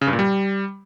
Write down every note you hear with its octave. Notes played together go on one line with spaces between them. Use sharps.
C#3
G2
A#2
G3